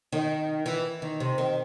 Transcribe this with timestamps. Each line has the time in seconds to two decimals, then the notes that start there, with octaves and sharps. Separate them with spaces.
0.13 D#3
0.66 E3
1.02 D#3
1.20 C3
1.38 D#3